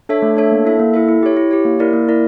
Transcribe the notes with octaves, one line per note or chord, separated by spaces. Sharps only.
D4 A4 C#5 E5
A3
D4 A4 C#5 E5
A#3
E4 A4 E5
A#3
E4 A4 E5
E4
G4 C#5
E4
G4 C#5
A#3
E4 A#4 D5
A#3
E4 A#4 D5